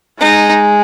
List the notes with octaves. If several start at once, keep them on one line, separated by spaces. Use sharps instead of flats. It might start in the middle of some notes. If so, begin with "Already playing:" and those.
G#3 D#4